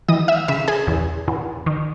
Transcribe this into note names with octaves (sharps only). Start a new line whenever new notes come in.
E3 D#5 D#6
E5 E6
C#3 E5 E6
G#4 G#5
E2
E2
D#3